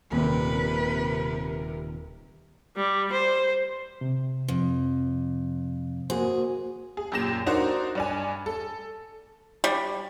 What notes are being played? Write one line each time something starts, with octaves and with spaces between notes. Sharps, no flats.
D#1 C3 A#3 G4 A#4 B4 B5
G3
C5
C3
F2
A#3 F#4 G#4 C5
G#4
F#2 A#2 G4 A#6 E7
D4 D#4 F#4 A#4 C5
G2 D4 G#5
A4
G3